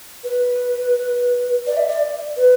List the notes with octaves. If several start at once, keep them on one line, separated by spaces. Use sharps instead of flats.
B4
D5
E5
D5
B4